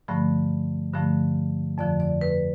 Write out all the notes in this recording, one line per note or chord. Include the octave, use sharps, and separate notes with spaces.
G2 D3 F3 A3
G2 D3 F3 A3
F2 D3 F3 D5
D5
B4